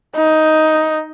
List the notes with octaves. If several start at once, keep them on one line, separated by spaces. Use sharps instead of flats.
D#4